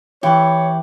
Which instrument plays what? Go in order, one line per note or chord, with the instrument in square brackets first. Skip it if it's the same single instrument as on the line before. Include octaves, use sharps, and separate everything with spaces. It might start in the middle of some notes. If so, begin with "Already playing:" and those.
[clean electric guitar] E3 E4 [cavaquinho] G4 [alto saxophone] C#5